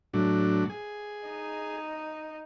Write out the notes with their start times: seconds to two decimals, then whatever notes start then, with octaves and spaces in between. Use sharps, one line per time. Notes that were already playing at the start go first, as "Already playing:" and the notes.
0.14 A2 F#3 D4
0.70 G#4
1.28 D#4